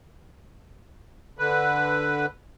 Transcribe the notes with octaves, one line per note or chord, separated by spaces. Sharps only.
D3 B4